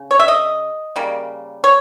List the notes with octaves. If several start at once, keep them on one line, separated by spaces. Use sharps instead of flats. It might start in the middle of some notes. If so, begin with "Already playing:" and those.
Already playing: C#3
C#5
E5
D#5
C#3 G3 A#3
C#5